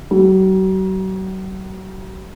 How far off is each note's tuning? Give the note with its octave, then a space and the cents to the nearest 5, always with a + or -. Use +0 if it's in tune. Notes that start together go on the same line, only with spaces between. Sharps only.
F#3 +40